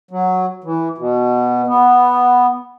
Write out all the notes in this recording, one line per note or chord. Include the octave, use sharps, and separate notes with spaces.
F#3
E3
B2
B3